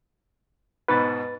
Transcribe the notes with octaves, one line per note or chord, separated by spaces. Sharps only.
G#2 B2 B4 A6